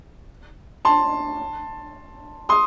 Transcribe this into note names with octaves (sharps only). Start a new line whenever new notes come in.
A5 C6
C6 D#6